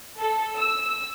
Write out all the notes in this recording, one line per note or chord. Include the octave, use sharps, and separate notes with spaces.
A4
E6